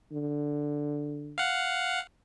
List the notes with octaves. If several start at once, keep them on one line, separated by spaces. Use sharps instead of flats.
D3
F5 F#5